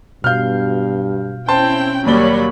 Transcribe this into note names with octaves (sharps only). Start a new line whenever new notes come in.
G2 B2 F5 F6 G6
C4 C#4 E4 C5 G5 A5 C6
D#2 F#3 G3 A#3 C#5 D5 B5 G7